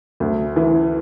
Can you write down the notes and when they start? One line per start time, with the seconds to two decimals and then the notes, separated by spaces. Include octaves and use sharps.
0.20 D2
0.56 E3